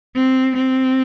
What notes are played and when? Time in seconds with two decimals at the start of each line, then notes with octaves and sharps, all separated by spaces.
0.16 C4
0.56 C4